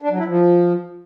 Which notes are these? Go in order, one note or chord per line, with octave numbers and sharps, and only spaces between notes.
D4
F#3
E4
F3